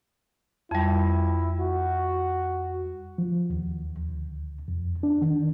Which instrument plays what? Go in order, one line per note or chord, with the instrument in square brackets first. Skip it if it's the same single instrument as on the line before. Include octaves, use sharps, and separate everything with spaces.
[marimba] F2 G3 [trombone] E4
[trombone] F#4
[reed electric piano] F3
D#2
D2
F2
D4
D#3